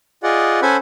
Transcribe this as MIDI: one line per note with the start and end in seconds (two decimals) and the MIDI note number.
0.23 0.60 65
0.23 0.60 68
0.23 0.60 74
0.23 0.60 75
0.23 0.60 78
0.62 0.77 61
0.62 0.77 69
0.62 0.77 72
0.62 0.77 78
0.62 0.77 80
0.62 0.77 83